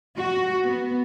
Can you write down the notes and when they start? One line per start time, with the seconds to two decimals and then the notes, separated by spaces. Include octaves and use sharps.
0.17 F#4
0.66 B3